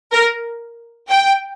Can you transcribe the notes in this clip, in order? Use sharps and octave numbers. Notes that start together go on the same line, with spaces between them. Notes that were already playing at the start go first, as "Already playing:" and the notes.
A#4
G5